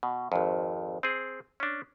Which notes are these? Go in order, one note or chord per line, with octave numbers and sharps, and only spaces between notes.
B2
G#1 F2
C4 G#4
C#4 D4